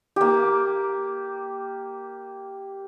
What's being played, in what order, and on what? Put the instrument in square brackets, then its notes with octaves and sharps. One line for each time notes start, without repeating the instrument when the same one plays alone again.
[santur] A#3 G4